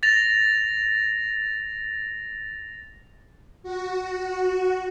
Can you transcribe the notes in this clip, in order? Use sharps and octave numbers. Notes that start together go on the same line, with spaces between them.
A6 A#6 F7
F#4